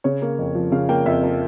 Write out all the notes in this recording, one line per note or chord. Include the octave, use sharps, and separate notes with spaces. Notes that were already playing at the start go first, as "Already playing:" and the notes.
C#3 C#5
A#3
F2
F3
C#3 F5
A#3 G5
F2 E5
F3 A#4